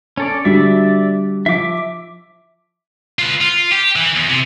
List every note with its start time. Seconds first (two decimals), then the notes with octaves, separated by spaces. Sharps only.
0.17 C#4 A4 D5
0.45 D3 G3 F#4 D5 E5
1.46 F3 E5 D6
3.19 F4 B4
3.41 F4
3.72 G4
3.96 E3
4.16 E2
4.29 C3